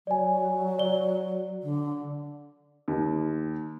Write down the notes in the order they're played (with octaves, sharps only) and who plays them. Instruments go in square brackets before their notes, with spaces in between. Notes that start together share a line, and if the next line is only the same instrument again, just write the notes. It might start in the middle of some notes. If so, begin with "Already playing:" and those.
[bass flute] F#3 [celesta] D5 G#5
[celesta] D5 G7
[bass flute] D3
[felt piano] D#2